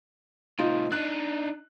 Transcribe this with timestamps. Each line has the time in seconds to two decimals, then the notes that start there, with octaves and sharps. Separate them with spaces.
0.59 A2 C3 D#4 F4
0.92 D4 D#4 F#6